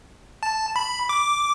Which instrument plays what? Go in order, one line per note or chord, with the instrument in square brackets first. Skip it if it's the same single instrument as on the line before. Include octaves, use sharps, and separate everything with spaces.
[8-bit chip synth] A5
B5
D6